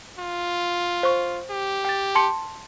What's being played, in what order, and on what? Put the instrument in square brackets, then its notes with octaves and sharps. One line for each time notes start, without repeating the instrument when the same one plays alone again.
[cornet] F4
[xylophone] C5 C#6
[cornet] G4
[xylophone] G5 A6
A5 C6 C#7